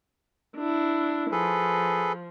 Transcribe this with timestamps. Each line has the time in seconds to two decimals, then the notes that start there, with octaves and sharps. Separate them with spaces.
0.56 D4 E4
1.32 F3 G#4 A4 B4